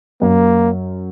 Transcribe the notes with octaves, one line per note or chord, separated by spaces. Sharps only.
F#2 A#3